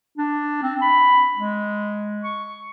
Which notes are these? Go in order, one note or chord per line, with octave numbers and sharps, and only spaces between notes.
D4
C4
B5
G#3
C#6